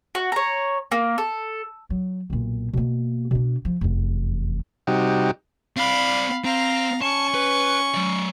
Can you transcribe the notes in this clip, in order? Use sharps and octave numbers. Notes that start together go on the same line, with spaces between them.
F#4
C#5 A#5
A#3
A4
F#3
B1 A#2
B2 A#3
B2 D4
F3
F1 E2
C3 G3 D#4 F#4 G4
C4 D5 F5 B5
C4 F5 A#5
C#4 A5 C#6
B4
F#3 D5